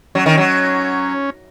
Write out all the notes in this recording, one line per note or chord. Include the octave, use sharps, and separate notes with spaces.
F#3 C#4
D#3
F#3